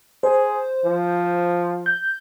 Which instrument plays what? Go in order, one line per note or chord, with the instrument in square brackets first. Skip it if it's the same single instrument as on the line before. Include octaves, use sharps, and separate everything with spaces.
[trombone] G#4 [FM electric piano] C5
[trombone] F3
[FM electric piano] G6